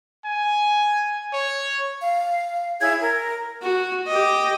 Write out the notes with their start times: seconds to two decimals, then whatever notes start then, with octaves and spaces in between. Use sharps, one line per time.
0.25 G#5
1.33 C#5
2.01 F5
2.81 E4 G#4 C#5 G#6
3.01 A#4
3.62 F#4
4.07 G4 D#5